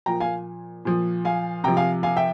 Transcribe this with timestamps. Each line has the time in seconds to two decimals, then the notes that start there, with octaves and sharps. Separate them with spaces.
0.06 A#2 F3 G5 A#5
0.20 F5 G#5
0.85 A#2 F3
1.25 F5 G#5
1.64 C3 F3 G5 A#5
1.77 F5 G#5
2.03 F5 G#5
2.17 E5 G5